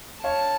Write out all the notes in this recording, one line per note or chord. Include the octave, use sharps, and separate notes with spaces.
C#5 F5 A5